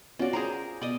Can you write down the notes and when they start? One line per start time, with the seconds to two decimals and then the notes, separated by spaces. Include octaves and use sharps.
0.19 C#4 F4 F#4 D5
0.33 G#4 A#4 C5 A#5
0.82 B2 D5 D#5